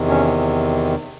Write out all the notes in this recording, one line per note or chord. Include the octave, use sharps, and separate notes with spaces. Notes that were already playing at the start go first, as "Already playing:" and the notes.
Already playing: E2 C3 D#3
C#4